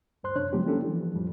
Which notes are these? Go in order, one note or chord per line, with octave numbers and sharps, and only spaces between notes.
D2 G2 C5 C6 F#6
F#2 C3 D4 C#5 F#6
C#3 F3 F#3 G#3 B3 G4
A#3 C#4 D4 E4 G4 A4
E3 F3
F2 A2 F3 G3